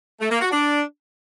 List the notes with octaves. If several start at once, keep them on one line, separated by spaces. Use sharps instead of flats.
A3
A#3
F#4
D4